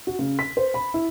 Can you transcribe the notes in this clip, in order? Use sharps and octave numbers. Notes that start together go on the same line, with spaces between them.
F#4
C#3
B6
C5
B5
E4